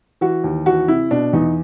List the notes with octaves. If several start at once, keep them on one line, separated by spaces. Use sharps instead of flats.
E3 F#4
D#2
E3 F#4
C3 E4
B2 D4
E2 D#4